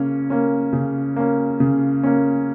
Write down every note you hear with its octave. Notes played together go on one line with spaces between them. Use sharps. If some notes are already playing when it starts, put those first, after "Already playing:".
Already playing: C#3 A#3 C#4
A#3 C#4
C#3
A#3 C#4
C#3
A#3 C#4